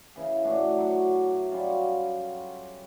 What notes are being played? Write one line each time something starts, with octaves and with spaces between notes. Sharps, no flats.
C#3 E3 G#4
A2 A3 D4 F#4
F#3
F#3 G3 C#4 F4